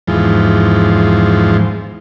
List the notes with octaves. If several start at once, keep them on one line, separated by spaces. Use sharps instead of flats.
E2 G#2 F3